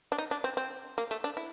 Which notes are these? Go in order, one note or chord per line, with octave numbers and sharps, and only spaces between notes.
D4
D#4
D4
C4
C4
A#3
A3
D4
E4